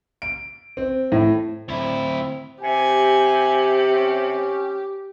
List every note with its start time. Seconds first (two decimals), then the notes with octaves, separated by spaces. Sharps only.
0.22 D7
0.77 C4
1.12 A2
1.69 D2 C4 E4
2.63 C3 G4 G#5
3.90 C#4